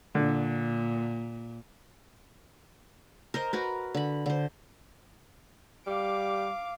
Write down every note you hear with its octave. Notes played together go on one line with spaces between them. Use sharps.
A#2 D3
A#4 C5 D#5
F#4 A#4 B4
D3 B5
D3 C5
G3 F5 D6